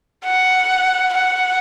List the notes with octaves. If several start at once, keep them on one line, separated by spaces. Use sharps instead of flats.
F#5
F#5